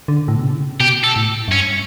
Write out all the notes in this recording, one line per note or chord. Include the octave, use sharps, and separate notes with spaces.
D3
A2
B2
C#3
B2 G4
A4
A2
F#2
G2 C#4